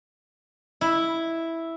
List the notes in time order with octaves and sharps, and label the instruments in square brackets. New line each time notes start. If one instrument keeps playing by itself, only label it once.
[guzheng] E4